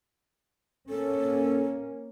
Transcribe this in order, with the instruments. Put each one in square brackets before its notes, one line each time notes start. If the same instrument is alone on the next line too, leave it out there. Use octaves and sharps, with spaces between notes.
[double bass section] A#3 C#4 [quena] A4